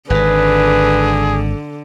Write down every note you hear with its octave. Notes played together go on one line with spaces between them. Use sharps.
G#1 G#2 D3 G#4 B4